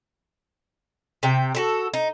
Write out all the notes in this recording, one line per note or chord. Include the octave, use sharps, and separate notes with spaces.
C3 G5
F#4 G4 A4
D#4